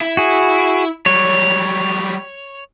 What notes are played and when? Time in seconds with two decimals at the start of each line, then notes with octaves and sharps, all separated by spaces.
0.01 E4
0.17 F#4 G#4
1.06 F#3 G3 C#5